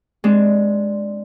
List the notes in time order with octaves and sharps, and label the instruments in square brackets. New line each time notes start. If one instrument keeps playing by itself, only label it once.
[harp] G#3 C4 D4